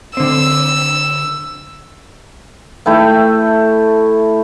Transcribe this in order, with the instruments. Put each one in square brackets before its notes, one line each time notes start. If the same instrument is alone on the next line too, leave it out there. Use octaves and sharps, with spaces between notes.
[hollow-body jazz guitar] D3 C4 [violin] E6
[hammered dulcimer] A3 E4 G5